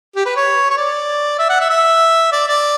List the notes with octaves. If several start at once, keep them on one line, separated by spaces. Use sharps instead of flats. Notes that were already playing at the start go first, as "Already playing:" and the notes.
G4
B4
C#5
C#5
D5
E5
F#5
E5
E5
D5
D5